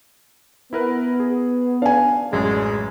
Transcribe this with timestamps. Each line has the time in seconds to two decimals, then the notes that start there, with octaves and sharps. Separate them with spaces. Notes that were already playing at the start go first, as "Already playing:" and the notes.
0.73 B3 E4 A#4 B4
1.20 G#4
1.82 D4 F5 G#5
2.33 A1 F#2 G#3